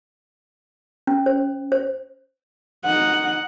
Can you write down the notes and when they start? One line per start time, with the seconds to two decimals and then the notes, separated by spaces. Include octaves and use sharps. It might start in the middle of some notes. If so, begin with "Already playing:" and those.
1.07 C#4
1.26 C5
1.72 C5
2.85 D#4 F#5